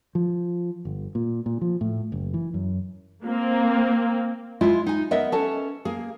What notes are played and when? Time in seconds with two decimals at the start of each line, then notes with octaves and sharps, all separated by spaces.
0.15 F3
0.85 G1
1.15 A#2
1.46 A#2
1.61 F3
1.81 A2
2.12 F#1
2.34 E3
2.54 F#2
3.24 A#3 C4
4.61 G#3 E4 F4 D#5
4.86 D#4 G#5
5.11 B3 A#4 D#5 E5
5.32 C#4 A4 B4 A5
5.85 A#3 G#4